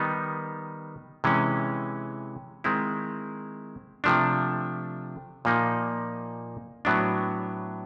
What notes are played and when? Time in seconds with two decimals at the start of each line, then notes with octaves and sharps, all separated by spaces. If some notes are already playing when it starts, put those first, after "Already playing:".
Already playing: D#3 G3 B3 D#4
1.24 C3 E3 G#3 C#4
2.64 D#3 G#3 C4 E4
4.04 C3 F3 A3 D4
5.45 A#2 F3 A#3 D#4
6.85 A2 F#3 B3 D4